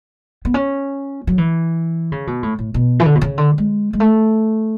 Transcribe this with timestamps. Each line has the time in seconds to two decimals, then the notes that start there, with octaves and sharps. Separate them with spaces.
0.45 B3
0.54 C#4
1.27 F#3
1.38 E3
2.12 C#3
2.27 B2
2.43 A2
2.59 A2
2.74 B2
3.00 E3
3.06 D3
3.15 B2
3.21 C#3
3.38 D3
3.58 G#3
3.93 G#3
4.00 A3